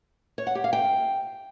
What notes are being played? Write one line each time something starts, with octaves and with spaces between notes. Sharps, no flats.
C#5
F#5
G4
F5
G5